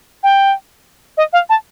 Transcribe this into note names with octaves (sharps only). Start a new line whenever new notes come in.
G5
D#5
F5
A5